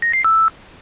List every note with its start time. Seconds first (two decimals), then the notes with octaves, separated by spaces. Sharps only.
0.02 A#6
0.13 C7
0.25 E6